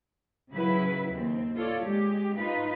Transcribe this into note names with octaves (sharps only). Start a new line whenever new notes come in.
C#3 F#3 E4 B4
D#2 C4
F4 A4 C#5 D5
G#3 G4
D#4 F4 B4